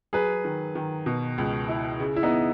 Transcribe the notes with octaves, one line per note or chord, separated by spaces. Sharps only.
F#3 G#4 B4
D#3
D#3
B2
C#2
E4
C#3
E4
B3 D#4